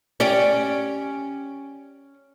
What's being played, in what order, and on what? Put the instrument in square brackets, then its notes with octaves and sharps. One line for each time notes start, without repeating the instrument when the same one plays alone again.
[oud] C#4 G4 D5